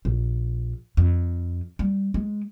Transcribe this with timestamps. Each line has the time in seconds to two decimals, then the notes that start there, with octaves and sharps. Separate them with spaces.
0.05 A#1
0.97 F2
1.79 G3
2.14 G#3